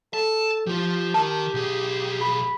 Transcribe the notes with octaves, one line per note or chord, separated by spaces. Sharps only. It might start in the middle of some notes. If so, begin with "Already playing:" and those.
A4 A5
F3 F4 G4
D#3 A#4 A5
B1 G#4
G4 B5